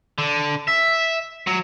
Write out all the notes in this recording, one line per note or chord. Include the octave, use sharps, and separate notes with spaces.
D3
E5
F#3